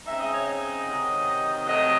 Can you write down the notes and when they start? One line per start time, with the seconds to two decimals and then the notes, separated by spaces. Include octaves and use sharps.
0.06 C#3 G#3 C4 D#4 E5
0.19 D#5
0.32 C#5
0.45 D#5
0.86 C3 D#3 F#3 C4 D#4
1.67 C3 F#3 A3 D#5